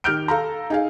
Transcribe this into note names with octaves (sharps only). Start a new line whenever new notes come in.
D#3 G4 F6 G6 D7
A4 F5 A#5
D#4 G#4 F5